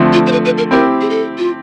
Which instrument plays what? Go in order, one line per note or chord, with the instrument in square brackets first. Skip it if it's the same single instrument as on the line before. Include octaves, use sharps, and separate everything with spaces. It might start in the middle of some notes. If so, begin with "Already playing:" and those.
Already playing: [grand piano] D3 F3 A3 C4
[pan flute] F4
C5
B4
B4
A#4
[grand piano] C4 E4 G4 [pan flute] A#4
[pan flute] G#4
A4
F4